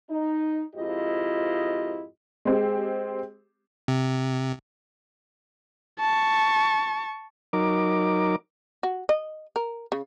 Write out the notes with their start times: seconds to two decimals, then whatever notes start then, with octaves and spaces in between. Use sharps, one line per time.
0.10 D#4
0.75 F2 G#2 E4 F4 G4 D#5
2.45 G#3 C4 G4
3.88 C3
6.00 A5 C#6
7.53 F#3 D#4 A#4 D6
8.83 F#4
9.09 D#5
9.56 A#4
9.92 C#3